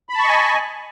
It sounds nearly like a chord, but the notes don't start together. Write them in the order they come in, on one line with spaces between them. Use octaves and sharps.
B5 A5 C#6 D#5 G#5